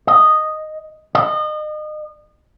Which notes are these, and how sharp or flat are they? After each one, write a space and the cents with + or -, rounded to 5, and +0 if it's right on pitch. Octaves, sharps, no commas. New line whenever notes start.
D#5 -5
D#5 -30